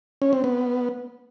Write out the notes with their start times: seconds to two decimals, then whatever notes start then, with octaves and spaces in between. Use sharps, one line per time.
0.22 C#4
0.33 C4
0.44 B3